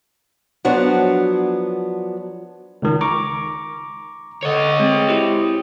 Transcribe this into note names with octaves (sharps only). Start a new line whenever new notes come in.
F3 F#3 B3 D4
C#2 D#3
A#5 C#6 D6
D3 C#5 D#5
G#3 C4
E4 G4